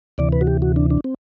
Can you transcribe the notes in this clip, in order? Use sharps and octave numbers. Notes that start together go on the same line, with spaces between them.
D2 C3 E3 D5
B4
F#4
G4
F#4
D4
D4
C4